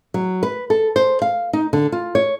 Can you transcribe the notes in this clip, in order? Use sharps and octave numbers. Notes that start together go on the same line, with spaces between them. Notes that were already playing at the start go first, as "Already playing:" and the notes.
F#3
B4
A4
C5
F5
D#4
D3
F4
C#5